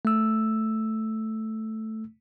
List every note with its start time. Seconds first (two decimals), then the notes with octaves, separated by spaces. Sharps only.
0.05 A3 E6